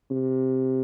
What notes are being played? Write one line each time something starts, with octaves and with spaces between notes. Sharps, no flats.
C3